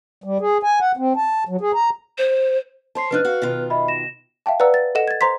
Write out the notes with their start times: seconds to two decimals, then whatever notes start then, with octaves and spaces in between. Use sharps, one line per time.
0.24 G3
0.41 G#4
0.63 G#5
0.80 F#5
0.97 C4
1.16 A5
1.49 F#3
1.61 G#4
1.74 A#5
2.18 C5
2.95 C5 C#5 A5 C6 C7
3.11 F3 D4 D#4 B4 F6 F#6
3.25 F#4 F5
3.42 B2 D#3 F4
3.70 D#5 E5 B5
3.88 A#6 E7
4.46 E5 F5 G5 A5
4.60 B4 D5 F#5 A#5 E6
4.74 A6
4.95 A4 D#5 F#5 E7
5.08 G#6 A6
5.21 C5 A#5 C6 B6